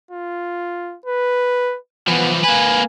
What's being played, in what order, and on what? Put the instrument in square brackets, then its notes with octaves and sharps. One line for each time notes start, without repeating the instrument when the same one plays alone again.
[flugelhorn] F4
B4
[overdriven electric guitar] E3 F3 [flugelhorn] B3
[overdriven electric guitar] A#3 B4 [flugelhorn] G#5